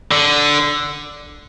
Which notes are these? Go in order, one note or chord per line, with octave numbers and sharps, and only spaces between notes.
D3